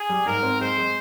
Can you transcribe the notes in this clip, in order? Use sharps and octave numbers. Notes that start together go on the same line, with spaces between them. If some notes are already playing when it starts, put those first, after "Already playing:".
Already playing: G#4
G3
G#2 A#4
C4
G#3 C5
G#3